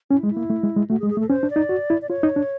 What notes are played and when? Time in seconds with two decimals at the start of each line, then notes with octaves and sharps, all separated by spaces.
0.11 C#4 E4
0.23 G#3
0.30 E4
0.37 A#3
0.50 A3
0.63 G#3
0.76 G#3
0.90 A3 F#4
1.00 G#4
1.03 G#3
1.10 G#4
1.17 A3
1.20 A4
1.29 C#4 C5
1.43 D4
1.50 D5
1.56 D#4
1.69 F#4
1.90 E4
2.02 D5
2.09 F4 C#5
2.23 D#4
2.36 D4